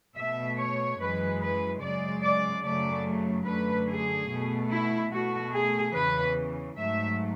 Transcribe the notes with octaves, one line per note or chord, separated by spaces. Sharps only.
B2 A3 E5
C#5
F#2 E3 G#3 B4
B4
F#2 C#3 G#3 D5
D5
F#2 C#3 F#3 A3 D5
F#2 D3 A3 B4
G#4
B2 A3
E4
B2 A3 F#4
G#4
E2 C#3 E3 B4
G#2 F#3 A3 E5